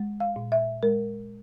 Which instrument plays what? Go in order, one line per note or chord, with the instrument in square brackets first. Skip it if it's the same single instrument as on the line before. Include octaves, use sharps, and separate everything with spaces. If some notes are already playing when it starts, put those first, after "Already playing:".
Already playing: [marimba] G#3
F5
A#2
E5
G#3 A#4